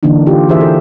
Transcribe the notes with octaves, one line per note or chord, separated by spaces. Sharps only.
D3 E3 A#3 D4 D#4
F4 G4
E3 G#4 A#4 C5 E5
A4